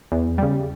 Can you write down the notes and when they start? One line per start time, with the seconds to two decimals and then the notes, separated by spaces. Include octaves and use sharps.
0.12 E2
0.38 C#3 G3